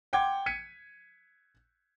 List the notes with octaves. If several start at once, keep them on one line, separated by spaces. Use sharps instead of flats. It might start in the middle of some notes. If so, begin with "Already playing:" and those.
F#5 G5 C6 D6 G#6
G#6 B6 C#7 D#7